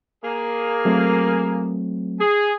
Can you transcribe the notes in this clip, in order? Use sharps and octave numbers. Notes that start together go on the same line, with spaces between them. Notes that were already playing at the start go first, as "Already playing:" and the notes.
A#3 G#4
F#3 A3 C4
G#4